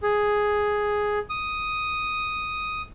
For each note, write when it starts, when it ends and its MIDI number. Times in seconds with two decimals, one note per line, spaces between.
0.03 1.19 68
1.30 2.82 87